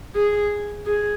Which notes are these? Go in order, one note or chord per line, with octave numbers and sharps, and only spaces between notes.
G#4
G#4